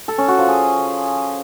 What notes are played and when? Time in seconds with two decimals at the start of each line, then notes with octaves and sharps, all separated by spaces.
0.08 A4
0.18 C#4
0.28 F#4
0.38 F3
0.48 G#4